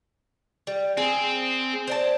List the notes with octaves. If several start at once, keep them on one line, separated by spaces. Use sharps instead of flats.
G3
C4 G#4
C5 D5 A5